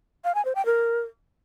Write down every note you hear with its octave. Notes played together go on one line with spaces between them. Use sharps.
F5
G#5
C5
G5
A#4